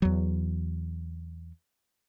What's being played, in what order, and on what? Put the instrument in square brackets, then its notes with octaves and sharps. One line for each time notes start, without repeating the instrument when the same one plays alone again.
[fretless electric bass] E2 F#3